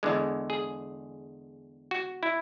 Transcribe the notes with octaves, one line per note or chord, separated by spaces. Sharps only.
E2 D3 G#3
G#4
F#4
E4